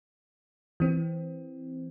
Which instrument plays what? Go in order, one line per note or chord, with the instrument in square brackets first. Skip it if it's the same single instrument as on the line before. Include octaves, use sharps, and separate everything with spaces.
[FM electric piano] E3 C4